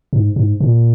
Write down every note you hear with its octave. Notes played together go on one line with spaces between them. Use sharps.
G#2
G#2
A#2